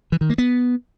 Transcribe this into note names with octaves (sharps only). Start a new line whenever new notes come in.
E3
D#3
A#3
B3